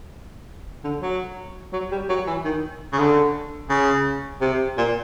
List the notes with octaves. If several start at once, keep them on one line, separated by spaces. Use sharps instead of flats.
D3
F#3
F#3
G3
F#3
E3
D#3
C#3
D3
C#3
C3
A#2